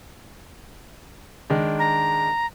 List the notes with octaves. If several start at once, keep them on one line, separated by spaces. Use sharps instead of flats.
D#3 G#3 D4
A#5